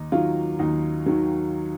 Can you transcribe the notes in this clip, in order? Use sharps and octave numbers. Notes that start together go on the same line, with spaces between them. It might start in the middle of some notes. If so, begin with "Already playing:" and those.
Already playing: D#2 D#4
D#3 F#3 F4
D#2 D#4
D#3 F#3